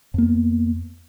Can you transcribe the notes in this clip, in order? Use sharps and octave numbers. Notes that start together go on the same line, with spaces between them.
F2 A#3 B3